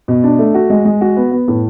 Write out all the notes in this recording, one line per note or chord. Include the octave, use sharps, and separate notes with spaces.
B2
D4
A3
F#4
G#3
G#3
F#4
B3
B3
A2